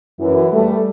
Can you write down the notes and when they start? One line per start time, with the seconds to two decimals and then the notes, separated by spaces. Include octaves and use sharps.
0.20 F#2 E3
0.53 G3 A3